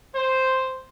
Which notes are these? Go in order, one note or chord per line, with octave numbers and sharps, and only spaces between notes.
C5